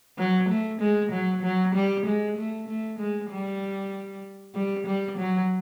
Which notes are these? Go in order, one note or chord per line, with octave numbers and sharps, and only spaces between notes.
F#3
A3
G#3
F#3
F#3
G3
G#3
A3
A3
G#3
G3
G3
G3
F#3